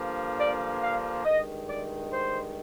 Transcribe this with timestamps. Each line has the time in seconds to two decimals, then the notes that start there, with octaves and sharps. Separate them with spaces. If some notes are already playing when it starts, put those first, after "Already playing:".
Already playing: G2 D3 F3 A#3
0.38 D5
0.81 F5
1.24 G2 D#3 G#3 D#5
1.67 D5
2.11 C5